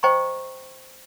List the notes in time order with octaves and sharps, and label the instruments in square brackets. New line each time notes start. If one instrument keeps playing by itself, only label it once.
[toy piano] C5 D#5 G5 A#5 C#6